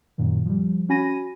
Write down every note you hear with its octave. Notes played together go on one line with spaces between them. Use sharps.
F#2 A#2 D#3
F3 G3
C#4 F#4 G#5 B5 A#6 D#7